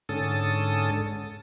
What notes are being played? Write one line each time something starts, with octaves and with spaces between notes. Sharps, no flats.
G#2 D3 C#4 A4 A5 D#6